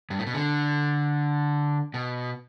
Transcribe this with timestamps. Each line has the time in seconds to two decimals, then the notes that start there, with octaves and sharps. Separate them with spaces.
0.10 G2
0.19 A2
0.27 B2
0.34 D3
1.94 B2